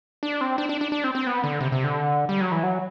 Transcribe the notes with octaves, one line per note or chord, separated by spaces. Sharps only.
D4
C4
D4
D4
D4
D4
C4
C4
B3
D3
C3
C3
D3
G3
F#3
E3
F#3